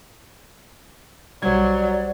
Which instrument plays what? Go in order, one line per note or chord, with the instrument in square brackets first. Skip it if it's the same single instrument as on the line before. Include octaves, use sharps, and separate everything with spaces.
[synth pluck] B1 G#6 [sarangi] F#3 [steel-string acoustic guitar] G3 C5 [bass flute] D5